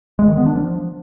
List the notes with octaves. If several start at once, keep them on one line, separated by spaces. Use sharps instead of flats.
G#3
D#3
B3
D4
F3